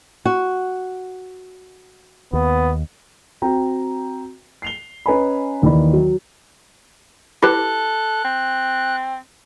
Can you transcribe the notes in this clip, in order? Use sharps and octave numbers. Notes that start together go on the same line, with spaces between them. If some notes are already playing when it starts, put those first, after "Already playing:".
F#4
D#2 B3
C4 F#4 G5 A#5
C7 F7 G7
C#4 B4 D#5 G#5 A#5 B5
D#2 D#3 E3 D5 B5
F#3
E4 G4 A4 B4 F#6
C4